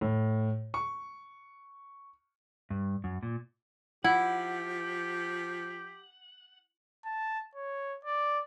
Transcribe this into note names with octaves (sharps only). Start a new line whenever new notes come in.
A2
C#6
G2
F#2
A#2
F3 E4 G4 F#5
A5
C#5
D5